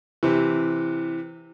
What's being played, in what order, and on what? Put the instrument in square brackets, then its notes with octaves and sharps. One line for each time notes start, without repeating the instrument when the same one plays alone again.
[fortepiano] C3 E3